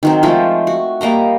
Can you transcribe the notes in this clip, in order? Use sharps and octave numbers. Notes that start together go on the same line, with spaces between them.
D#3 F#3 C4
F3 G#3 A3 F4
F#4
G3 A#3 D#5 A#5